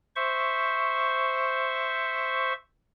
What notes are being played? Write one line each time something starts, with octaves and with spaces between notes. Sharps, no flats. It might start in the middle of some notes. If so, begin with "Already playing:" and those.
C5 E5 C#6